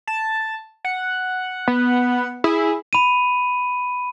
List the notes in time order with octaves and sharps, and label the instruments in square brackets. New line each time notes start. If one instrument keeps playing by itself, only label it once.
[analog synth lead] A5
F#5
[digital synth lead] B3
[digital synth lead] E4 [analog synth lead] G#4
[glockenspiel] B5 D#7